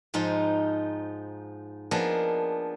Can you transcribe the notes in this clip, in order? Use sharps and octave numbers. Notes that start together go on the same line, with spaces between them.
G#2 F3 D#4 F4
F3 A#3 B3 D4 G#4 D#5